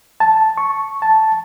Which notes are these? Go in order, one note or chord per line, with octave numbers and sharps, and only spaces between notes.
A5
C#6
A5